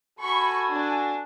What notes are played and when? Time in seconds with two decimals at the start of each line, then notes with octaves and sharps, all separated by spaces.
0.20 F#4 A4 G#5 B5 C#6
0.70 D4